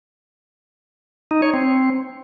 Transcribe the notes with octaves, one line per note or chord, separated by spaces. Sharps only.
D#4
C#5
C4